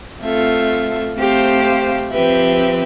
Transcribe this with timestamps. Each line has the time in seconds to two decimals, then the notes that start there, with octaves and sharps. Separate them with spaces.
0.22 A3 C4 F4 A4 E5
1.16 A3 C4 G4 C5 F5
2.11 F3 C4 G4 B4 E5